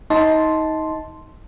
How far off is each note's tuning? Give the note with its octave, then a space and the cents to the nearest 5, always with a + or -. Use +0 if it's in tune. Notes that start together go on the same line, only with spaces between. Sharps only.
D#4 +25 A5 -5 C6 +0